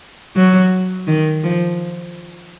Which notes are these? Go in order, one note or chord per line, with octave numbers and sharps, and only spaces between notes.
F#3
D#3
F3